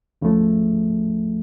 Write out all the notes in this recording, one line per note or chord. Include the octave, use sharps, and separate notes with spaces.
D2 C#3 F3 A3